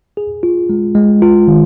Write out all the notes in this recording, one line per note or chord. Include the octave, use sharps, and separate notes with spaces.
G#4
F4
G#3
G#3
F4
D#3